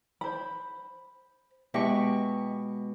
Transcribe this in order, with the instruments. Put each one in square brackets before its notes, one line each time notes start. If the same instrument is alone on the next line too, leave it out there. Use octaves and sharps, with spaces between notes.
[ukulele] C5 B5
[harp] B2 G#3 C#6 [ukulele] G4 D#5 E5